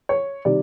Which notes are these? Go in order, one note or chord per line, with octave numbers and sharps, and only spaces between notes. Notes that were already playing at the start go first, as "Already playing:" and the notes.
C#5
C3 D#3 G3 D5